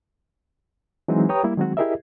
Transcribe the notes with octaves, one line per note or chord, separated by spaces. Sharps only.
E3 F#3 G#3 C4 D#4
G4 B4 C#5 G5 A#5 D#6
G3 A#3 E4
D#3 F#3 G#3 C4 F#4
E4 G4 G#4 A#4 D#5 E5